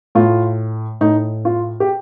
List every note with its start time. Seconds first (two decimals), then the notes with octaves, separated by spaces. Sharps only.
0.15 A2 F4
1.01 A2 D#4
1.45 F4
1.80 G4